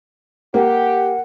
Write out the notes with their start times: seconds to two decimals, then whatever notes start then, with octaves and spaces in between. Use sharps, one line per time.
0.54 A#3 G4 F#5